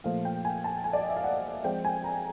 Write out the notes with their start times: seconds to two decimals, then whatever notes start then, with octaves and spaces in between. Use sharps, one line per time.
0.04 A#2 F3 A3 F5
0.25 G5
0.45 G#5
0.64 A5
0.84 G#5
0.93 D5
1.01 D#5
1.09 E5
1.16 F5
1.24 F#5
1.64 F3 G#3 C4 G5
1.85 G#5
2.04 A#5